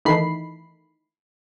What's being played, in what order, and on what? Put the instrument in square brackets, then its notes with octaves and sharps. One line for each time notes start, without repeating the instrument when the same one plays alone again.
[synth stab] D#3 E3 A3 B5 C7